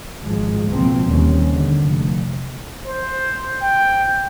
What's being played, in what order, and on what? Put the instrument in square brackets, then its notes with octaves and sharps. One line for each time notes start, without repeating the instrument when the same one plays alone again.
[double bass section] G#1 F3 G#3
C#2 B2 F3 A#3 C4
D#2 D#3 G3 C#4
D3
F1
[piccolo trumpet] C5
G5